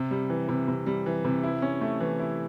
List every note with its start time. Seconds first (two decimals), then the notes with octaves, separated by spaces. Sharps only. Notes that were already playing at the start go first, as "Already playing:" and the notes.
Already playing: C3
0.11 G3
0.30 E3
0.49 C3
0.68 C3
0.86 G3
1.06 E3
1.25 C3
1.43 E4
1.62 C#4
1.81 A3
2.00 E3
2.19 E4